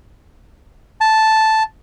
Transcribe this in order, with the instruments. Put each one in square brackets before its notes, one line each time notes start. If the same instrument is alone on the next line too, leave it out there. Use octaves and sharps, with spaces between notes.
[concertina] A5